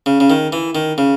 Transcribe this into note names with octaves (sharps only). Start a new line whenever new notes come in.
C#3
C#3
D#3
E3
D#3
C#3